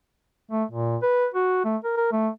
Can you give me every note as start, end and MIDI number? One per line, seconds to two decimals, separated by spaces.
0.51 0.64 57
0.71 0.97 46
1.03 1.28 71
1.34 1.62 66
1.65 1.77 57
1.84 1.94 70
1.97 2.11 70
2.12 2.29 57